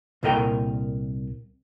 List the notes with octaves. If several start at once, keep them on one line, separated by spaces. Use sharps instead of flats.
C2 A#2 A4 A#4 D#5 G5